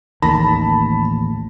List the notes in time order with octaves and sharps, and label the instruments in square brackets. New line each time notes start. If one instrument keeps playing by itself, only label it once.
[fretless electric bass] A1 D#2 D#3 [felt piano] A5 B5 A#6